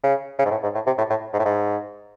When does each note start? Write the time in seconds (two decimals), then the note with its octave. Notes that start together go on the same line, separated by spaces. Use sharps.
0.03 C#3
0.39 C#3
0.45 G#2
0.51 A2
0.63 G#2
0.75 A2
0.86 C3
0.98 A2
1.10 A2
1.33 G#2
1.39 A2
1.45 G#2